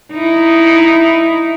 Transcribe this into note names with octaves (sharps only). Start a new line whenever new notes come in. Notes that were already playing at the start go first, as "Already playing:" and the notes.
D#4 E4